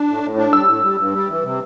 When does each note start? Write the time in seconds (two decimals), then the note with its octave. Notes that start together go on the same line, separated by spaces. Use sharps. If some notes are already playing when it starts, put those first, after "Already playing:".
Already playing: D4
0.09 A2
0.23 A2
0.37 D4
0.53 G3 E6
0.67 A2
0.83 G3
0.98 G2
1.13 G3
1.28 E3
1.43 C3